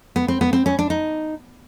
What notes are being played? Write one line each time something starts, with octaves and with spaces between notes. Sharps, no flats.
B3
C4
B3
C4
C#4
D4
D#4